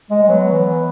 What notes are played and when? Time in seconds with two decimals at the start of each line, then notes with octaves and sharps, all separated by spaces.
0.10 G#3
0.23 G#3
0.29 F#3 B3
0.52 E3